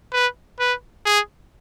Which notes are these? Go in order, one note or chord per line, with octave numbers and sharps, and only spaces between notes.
B4
B4
G#4